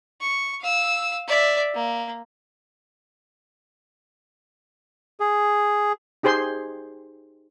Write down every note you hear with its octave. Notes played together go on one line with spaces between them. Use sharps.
C#6
F5 E6
D5 E5
A#3
G#4
D#4 G4 G#4 C5 C6